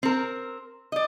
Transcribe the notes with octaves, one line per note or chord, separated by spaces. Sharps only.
C4 A#4
D5 D#5